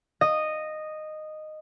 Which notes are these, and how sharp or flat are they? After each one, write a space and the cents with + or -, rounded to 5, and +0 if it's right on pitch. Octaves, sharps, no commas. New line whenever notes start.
D#5 -10